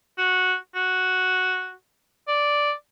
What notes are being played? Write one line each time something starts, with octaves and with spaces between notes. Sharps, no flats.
F#4
F#4
D5